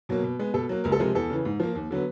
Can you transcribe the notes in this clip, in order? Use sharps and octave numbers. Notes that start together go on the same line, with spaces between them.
B2 F#3 A#3
B2
G#3 B3
B2 A4
F#3 A#3
C#2 A#4
A4
C3 F3 G#3 A#4
E2 A4
C#3 E3
G#2
F3 A#3
D#2
D3 F#3 B3